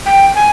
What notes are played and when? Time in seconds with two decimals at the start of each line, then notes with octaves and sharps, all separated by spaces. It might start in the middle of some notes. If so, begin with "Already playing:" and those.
0.06 G5
0.35 G#5